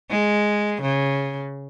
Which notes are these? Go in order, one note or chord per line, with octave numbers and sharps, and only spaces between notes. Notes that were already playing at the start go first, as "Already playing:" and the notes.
G#3
C#3